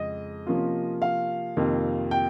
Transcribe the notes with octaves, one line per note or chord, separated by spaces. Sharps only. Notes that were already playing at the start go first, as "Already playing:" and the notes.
Already playing: F2 C#3 G#3 D#5
C3 F3 A#3 C#4 F4
F5
F2 C3 D#3 A#3 F4
G5